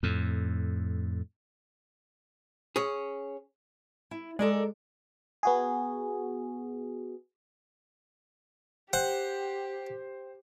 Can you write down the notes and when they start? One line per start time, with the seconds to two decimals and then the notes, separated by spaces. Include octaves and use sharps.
0.03 F2 A2
2.76 C#4 G#4
4.11 E4
4.39 G#3 A4 A#4 D5
5.43 B3 F#4 G#4
8.93 G4 C5 F#5 G5